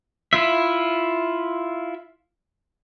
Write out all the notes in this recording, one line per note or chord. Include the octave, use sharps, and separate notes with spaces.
E4 F4 E5